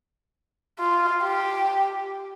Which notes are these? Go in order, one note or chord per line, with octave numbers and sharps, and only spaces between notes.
F4
G4